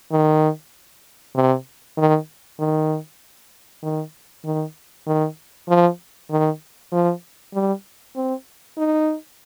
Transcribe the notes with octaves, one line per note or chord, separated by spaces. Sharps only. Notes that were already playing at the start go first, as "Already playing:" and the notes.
D#3
C3
D#3
D#3
D#3
D#3
D#3
F3
D#3
F3
G3
C4
D#4